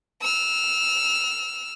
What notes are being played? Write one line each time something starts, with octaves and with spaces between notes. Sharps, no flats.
E6 F6